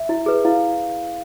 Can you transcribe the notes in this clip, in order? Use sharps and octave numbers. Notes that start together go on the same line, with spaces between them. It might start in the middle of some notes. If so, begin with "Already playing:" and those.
Already playing: E5
E4
G#4 B4
E4 F5